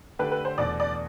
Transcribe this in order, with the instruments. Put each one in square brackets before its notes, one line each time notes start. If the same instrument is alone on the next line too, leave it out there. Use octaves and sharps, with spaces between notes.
[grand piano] D3 A3 D4 G4 [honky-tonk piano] B4
[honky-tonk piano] B4
C5
[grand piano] E2 B2 A3 [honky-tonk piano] D5
[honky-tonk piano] D5